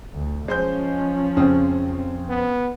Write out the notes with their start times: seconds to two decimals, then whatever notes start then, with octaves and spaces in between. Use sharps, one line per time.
0.14 D2
0.48 F3 G#3 C#4 C5 G6
1.37 F2 C#3 C4
2.29 B3